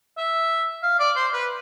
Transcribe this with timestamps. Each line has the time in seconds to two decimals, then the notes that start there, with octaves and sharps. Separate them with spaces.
0.18 E5
0.83 F5
0.99 D5
1.16 C5
1.33 B4